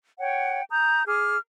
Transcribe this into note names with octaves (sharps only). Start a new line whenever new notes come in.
C#5 F#5 G5
A#5 D#6 G6
G#4 D6 F6